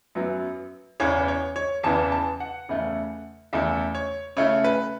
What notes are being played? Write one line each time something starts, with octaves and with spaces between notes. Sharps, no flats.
F#2 F#3 B3 E4
E2 C#3 E3 B3 C#5
C#5
C#5
E2 C#3 E3 B3 A5
A5
F#5
E2 C#3 A3 E4
E2 C#3 A3 E4 E5
C#5
C#3 A3 E4 C#5
B4